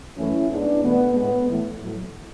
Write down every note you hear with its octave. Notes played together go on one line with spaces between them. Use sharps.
F#2 E3 A3 C#4 E4
G#2 G#3 B3 D4
E2 B2 A3 B3
A2 G#3 B3
A2 E3 A3
A2 F#3 A3